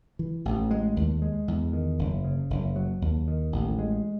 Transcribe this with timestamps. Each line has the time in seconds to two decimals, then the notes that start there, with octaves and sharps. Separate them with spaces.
0.19 E3
0.45 A1
0.71 G#3
0.96 D#2
1.22 G#3
1.48 E2
1.73 D#3
1.99 F#1
2.24 C#3
2.50 F#1
2.76 F#3
3.02 D#2
3.28 D#3
3.52 A1
3.79 G#3